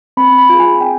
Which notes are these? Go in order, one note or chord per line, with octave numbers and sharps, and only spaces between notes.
C4 B5
B5
F4 G#4
G#5
C4 G5